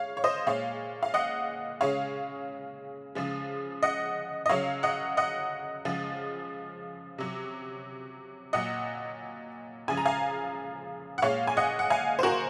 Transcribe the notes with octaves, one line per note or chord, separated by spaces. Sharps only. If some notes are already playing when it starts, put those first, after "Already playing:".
Already playing: G#3 C#5 F5
C#5
C5 D#5
A#2 G#3 C#5 F5
F5
D#5 F#5
C#3 G#3 C#5 F5
C#3 F3 G#3
D#5 F#5
D#5
C#3 F#3 C#5 F5
D#5 F#5
D#5 F#5
C#3 F3 G#3
C3 F#3
A#2 F#3 D#5 F#5
C#3 F3 G#3 G#5
A#5
F5 G#5
F#5
A#2 G#3 C#5 F5
G#5
D#5 F#5
F#5
F5 G#5
C5
F#4 A#4